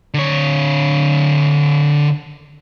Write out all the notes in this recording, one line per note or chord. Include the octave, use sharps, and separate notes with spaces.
D3 C#5